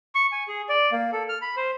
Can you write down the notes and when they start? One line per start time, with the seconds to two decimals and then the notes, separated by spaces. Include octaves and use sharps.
0.15 C#6
0.32 G#5
0.48 G#4
0.69 D5
0.92 A#3
1.12 A4
1.29 F6
1.42 B5
1.57 C5